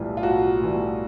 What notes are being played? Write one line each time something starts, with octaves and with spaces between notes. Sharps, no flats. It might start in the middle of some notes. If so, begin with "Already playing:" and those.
Already playing: B1 A2 E3 G3 F4
F4
B1 F#4
A2 E3 G3